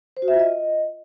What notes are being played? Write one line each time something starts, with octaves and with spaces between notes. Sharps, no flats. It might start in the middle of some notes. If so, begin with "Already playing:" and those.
C5
F#4
E5
F4
D#5